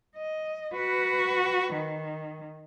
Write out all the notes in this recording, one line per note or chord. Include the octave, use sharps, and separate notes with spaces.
D#5
F#4 B4
D#3